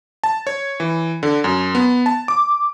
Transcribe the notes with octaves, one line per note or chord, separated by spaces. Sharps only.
A5
C#5
E3
D3
F#2
B3
A5
D6